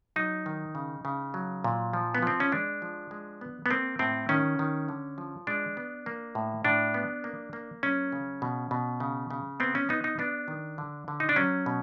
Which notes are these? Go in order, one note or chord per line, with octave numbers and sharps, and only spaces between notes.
F#3 D#4
D#3
C#3
C#3
F#3
A#2
F3
B3
F3 C4
C#4
G#3 D4
F3
G#3
B3
B3
A#3 C4
A2 C4
D#3 C#4
D#3
D3
F3
G#3 D4
B3
A#3
A2
A2 D4
B3
A#3
A#3
F#3 C#4
C#3
B2
B2
C#3
C#3
B3 C4
C#4
B3 D#4
D#4
B3 D4
D#3
D3
D3
D#4
D4
F#3 C#4
B2